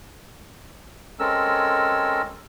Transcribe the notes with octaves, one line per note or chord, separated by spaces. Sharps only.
G#3 C4 C#4 A4 A#4 E6